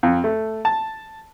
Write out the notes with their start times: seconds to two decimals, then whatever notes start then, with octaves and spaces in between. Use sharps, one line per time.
0.03 F2
0.24 A3
0.65 A5